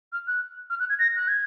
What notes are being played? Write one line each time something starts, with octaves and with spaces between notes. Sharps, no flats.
F6
F#6
F6
F#6
G#6
A#6
F#6
G#6